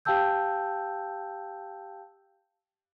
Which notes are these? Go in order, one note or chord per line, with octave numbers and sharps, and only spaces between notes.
G4 F5 G5 A5 E6 G6